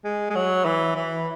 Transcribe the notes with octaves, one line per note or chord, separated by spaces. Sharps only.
G#3
G#3
F#3
E3
E3